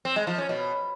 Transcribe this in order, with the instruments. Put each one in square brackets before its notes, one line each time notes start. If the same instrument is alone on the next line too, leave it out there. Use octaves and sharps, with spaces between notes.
[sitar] C4
G#3
F3
C#4
B2